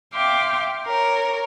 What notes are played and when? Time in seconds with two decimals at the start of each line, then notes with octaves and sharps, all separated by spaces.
0.13 E5 F5 G5 C6 D6
0.86 A#4 C#5